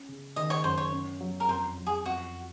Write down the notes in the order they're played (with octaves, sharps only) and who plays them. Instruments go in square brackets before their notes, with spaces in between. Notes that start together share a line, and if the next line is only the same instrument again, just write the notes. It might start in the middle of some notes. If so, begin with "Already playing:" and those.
Already playing: [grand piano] C#4
C#3
[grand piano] D#3 [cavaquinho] D#5
[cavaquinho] C#5
[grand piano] F#2 [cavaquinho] C5
[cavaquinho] C#5
[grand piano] C#4
F#3
[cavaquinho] A#4
[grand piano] F2 [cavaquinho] C5
[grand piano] F#3
[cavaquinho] G#4
[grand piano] F2 [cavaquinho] F#4